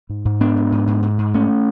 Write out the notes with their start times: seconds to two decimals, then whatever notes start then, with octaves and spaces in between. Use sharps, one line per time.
0.09 G#2
0.25 G#2
0.40 G#2 B3 D4
0.57 G#2
0.72 G#2
0.87 G#2
1.02 G#2
1.18 G#2
1.34 G#2 A3 C#4